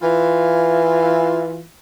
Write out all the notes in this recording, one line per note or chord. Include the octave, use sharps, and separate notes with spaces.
E3 F4